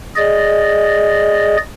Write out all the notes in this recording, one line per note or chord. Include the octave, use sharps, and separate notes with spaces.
G#4 D5 D#5